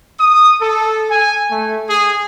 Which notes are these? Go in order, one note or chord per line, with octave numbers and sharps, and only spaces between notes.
D#6
A4
G#5
A3
G#4